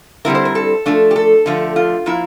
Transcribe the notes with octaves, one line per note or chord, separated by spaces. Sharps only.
D3 G3 C4 E4 A#4
C5
A#4
A4
F3 A3 D4
G4
A4
D3 F3 A3
F4
F3 A#3 E4